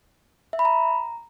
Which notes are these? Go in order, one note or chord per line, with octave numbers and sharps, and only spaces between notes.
E5
B5
A#5